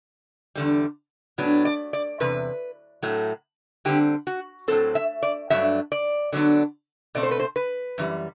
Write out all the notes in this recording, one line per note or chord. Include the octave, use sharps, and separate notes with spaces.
E2 D3 G3
A2 F#3 B3 D4
D5
D5
E2 C3 B4
A2 F#3 A3
D3 G3 C4 G4
F#4
A2 F#3 C4 A4
E5
D5
G2 F#3 A3 D4 E5
D5
D3 F#3 B3 D4
B2 A3 C4 D5
C5
B4
C5
B4
F#2 E3 G3